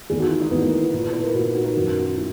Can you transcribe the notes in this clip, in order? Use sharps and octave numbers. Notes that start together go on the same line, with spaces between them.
E2 D#3 G#4
F#4
E4
D#4
E2 D#3 B3
A#3
E4
A#2 E4
B4
B4
A#4
A#2 F#4
D#4
F#4
A#4
F#2 D#3 F#4
F#4
E4